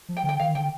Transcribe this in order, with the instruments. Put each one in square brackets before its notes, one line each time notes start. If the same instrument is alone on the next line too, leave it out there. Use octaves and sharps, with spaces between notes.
[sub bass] F3
[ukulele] G5
[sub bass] D3
[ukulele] G5
[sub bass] D#3 [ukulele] F5
[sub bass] D3 [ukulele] G5